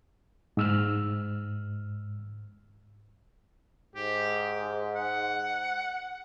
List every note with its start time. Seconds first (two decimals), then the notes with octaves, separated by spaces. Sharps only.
0.57 G#2 E6 F6
3.96 G#2 G4
4.96 F#5